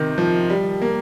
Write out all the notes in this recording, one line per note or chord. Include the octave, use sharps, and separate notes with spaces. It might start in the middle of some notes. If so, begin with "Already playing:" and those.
Already playing: C3 D#3
F3
G3
A#3